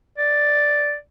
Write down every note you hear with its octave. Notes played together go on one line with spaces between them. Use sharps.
D5